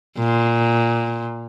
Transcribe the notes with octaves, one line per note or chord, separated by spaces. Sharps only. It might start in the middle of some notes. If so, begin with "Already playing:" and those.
A#2